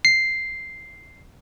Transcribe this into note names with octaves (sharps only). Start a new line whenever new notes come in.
C7